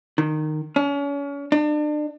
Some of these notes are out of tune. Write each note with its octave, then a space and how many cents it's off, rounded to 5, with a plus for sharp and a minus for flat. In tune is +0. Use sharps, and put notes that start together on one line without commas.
D#3 -15
C#4 +35
D4 +35